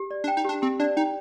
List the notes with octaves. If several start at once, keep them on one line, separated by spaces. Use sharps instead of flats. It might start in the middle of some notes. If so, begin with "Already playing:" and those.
Already playing: G4
D5
D4
G5
D#4
D4 G4
C4 G4
D4 D5
D#4 G5